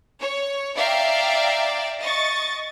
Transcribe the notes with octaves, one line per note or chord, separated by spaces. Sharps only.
C#5
D5 E5 F5 G5 A#5
D#5 C#6 A6